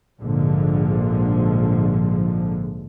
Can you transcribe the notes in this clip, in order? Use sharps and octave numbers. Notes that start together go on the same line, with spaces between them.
A#1 G#2 D3 F3